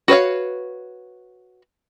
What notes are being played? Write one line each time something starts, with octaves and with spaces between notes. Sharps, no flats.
F#4 B4 C#5 F5